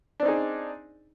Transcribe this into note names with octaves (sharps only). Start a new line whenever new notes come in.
C4 D4 D#4 G#4